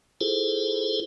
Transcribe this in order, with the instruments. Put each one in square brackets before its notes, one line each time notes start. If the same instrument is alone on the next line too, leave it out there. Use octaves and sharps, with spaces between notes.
[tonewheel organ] E4 F4 G#4 A4 C5